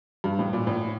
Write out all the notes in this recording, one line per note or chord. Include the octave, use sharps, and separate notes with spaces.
G2
A2
A#2
A2